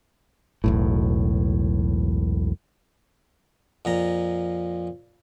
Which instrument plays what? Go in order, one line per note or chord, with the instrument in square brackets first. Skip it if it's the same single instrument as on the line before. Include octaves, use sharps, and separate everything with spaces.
[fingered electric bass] E1 B1 A2
[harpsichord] F2 A#2 A#5